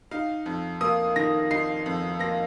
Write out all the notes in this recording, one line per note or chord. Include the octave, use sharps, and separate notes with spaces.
D#4 F5
F2
A#3 D#6
D#3 A#6
D#4 C7
F2
A#3 A#6